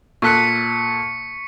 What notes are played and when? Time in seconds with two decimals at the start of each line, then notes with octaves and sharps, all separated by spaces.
0.22 A#2 A4 C#6 F#6 B6 C#7